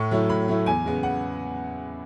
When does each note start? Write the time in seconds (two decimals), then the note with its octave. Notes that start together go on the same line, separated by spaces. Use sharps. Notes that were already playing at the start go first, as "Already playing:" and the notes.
Already playing: A2 C#6
0.11 F#3 A3 E4
0.29 A2 B5
0.48 F#3 A3 E4
0.66 E2 G#5
0.85 C#3 G#3 B3
1.03 F#5